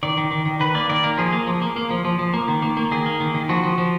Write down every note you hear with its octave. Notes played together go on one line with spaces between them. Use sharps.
D#3 D5
D#3
D#3
D#3
D#3 B4
A#3 D5
D#3 D5
A#3 A#4
F3 G#4
A#3
F3
A#3
A#3
F3
F3
F3
A#3
D#3
A#3
A#3
D#3 G#4
A#3
D#3
D#3
F3 F#4
F3
F3